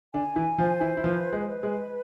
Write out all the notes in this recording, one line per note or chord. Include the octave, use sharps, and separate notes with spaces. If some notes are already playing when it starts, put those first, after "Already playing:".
D3 D4 G#5
E3 E4
F3 F4 C5
E3 E4
E4
F3 F4 B4
G#3 G#4
B4
G#3 G#4